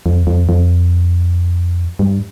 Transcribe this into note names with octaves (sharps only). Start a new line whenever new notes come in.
F2
F2
F2
G2